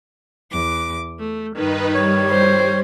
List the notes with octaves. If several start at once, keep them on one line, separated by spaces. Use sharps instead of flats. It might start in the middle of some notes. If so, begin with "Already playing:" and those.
E2 D6
A3
G2 D#3 D#4 B4
G3 C#5
C5